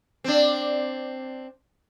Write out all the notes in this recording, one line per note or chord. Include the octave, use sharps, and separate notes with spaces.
C4 D4